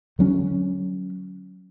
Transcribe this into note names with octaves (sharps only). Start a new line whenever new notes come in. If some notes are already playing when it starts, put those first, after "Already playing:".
D3 F#3 C#4